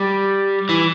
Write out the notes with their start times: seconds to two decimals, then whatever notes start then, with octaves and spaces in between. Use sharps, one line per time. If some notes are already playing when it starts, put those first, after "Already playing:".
Already playing: G3
0.69 E3